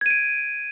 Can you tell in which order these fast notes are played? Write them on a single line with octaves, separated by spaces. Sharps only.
G#6 D#7 D7